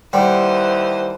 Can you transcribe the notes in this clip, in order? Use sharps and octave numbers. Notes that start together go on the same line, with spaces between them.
D#2 G3 E4 B4 C5 F#5 G5 C6